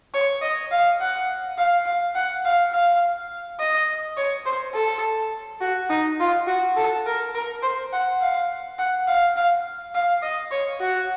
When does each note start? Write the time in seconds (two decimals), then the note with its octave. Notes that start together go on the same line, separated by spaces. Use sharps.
0.14 C#5
0.42 D#5
0.71 F5
1.00 F#5
1.58 F5
1.86 F5
2.15 F#5
2.45 F5
2.72 F5
3.60 D#5
4.17 C#5
4.45 C5
4.74 A4
5.61 F#4
5.90 D#4
6.19 F4
6.47 F#4
6.77 A4
7.06 A#4
7.35 A#4
7.63 C5
7.93 F#5
8.21 F5
8.79 F#5
9.07 F5
9.36 F5
9.94 F5
10.22 D#5
10.51 C#5
10.80 F#4